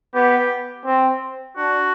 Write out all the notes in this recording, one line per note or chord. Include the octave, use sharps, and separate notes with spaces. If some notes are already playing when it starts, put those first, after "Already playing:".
B3 G4
C4
D4 F#4